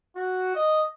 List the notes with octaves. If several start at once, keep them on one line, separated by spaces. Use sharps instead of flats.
F#4
D#5